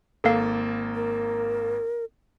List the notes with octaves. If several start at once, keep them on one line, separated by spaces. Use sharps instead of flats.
G#1 A#3 A4 F5
A#4